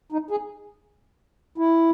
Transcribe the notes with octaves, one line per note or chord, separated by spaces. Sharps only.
D#4
G#4
E4